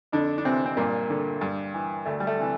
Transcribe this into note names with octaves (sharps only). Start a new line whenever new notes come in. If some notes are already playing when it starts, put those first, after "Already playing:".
F2 D3 D4
D4
C3 E3 C4
C4
G2 A#2 A#3
D3
G2
E3
D2 A3
G3
A3
C3 E3